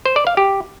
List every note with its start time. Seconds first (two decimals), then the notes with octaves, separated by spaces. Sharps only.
0.06 C5
0.16 D5
0.27 F5
0.37 G4